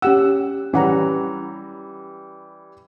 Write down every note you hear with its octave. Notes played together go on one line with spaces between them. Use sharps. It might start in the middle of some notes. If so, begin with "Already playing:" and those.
C#4 G4 F#5 E6
E3 G3 C#4 F#5 A#5